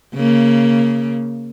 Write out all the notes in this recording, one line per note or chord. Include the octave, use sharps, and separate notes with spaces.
C#3 A#3